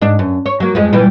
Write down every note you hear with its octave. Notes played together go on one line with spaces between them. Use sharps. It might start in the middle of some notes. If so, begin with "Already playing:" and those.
G#2 D4
F#2
C#5
F#3 A#3
F2 F3 G#3
A#2 E3 G3